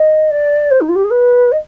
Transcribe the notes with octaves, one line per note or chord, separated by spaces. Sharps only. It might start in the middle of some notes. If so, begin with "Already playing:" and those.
Already playing: D#5
D5
C5
D#4
F4
G4
G#4
B4
D#5